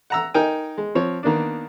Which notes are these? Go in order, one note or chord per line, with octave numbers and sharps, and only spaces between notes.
F#5 A#5 E6
D#4 A#4 G5 G#5
G#3
F3 C4 C#5
D#3 A#3 B3 D4